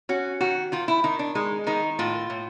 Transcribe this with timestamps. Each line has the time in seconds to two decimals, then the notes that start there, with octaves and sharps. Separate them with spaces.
0.09 C#4 F#4
0.41 D#3 F#4
0.72 D#3 F4
0.88 E4
1.04 D#3 D#4
1.19 D4
1.35 G#3 D#4
1.67 D#3 D#4
1.99 A2 F4
2.30 A2